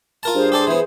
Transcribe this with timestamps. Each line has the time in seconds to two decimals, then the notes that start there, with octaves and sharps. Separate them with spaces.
0.23 F4 A#4 A5
0.35 G2 G#4 C5
0.52 G4 A4 D5
0.67 E3 B3